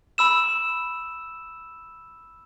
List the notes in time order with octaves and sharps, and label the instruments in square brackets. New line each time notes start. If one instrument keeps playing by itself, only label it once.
[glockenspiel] B5 E6 E7